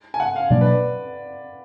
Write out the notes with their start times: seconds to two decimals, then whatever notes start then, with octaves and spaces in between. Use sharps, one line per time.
0.14 G#5
0.20 F#5
0.36 F5
0.50 B2 F#3 A#3 D4 D5
0.61 B4
0.66 D5